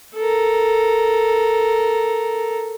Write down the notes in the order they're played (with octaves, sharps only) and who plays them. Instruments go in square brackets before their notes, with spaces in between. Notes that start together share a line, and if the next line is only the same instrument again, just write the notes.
[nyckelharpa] A4 A#4